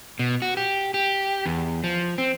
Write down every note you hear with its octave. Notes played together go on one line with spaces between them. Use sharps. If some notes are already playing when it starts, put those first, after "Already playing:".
B2
F#4
G4
G4
E2
F3
C4